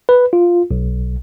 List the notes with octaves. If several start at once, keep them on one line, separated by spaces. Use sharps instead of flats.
B4
F4
B1